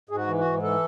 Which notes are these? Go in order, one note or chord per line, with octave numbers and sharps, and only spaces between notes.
G#2 G#4
F#4
E3
F#4
G#2
E3 A4